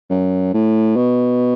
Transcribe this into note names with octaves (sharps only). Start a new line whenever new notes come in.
F#2
A2
B2